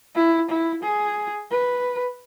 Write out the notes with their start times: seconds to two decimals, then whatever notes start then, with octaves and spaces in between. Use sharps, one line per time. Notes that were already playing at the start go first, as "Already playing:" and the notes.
0.15 E4
0.49 E4
0.82 G#4
1.51 B4